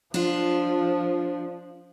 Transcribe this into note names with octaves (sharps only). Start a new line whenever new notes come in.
F3 D4 F4